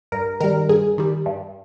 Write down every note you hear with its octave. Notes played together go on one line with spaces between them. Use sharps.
G2 A#4
D#3 G3 A#4
G2 G#4
D#3 G3
G2